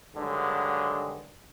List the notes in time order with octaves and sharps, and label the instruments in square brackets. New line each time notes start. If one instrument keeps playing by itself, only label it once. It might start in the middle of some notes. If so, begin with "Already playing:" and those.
[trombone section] G2 D3 D#3 F#3 G#3